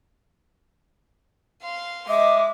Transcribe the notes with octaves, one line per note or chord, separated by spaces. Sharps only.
F5 C6
G#3 D#5 E5 D6